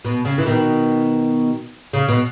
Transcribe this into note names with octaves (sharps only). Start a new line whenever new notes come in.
B2
C#3
E3
B2 D#3
C#3
B2